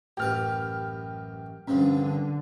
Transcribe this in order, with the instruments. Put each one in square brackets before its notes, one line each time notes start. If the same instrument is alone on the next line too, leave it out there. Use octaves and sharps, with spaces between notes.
[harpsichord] A1 F#2 B4 [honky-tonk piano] G4 F6
[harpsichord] C2 G2 F3 [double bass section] D3 [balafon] C#4